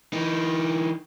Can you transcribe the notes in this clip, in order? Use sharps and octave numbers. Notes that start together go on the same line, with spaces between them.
E3 D#4